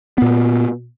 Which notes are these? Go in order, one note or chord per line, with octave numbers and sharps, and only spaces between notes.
A#2 B3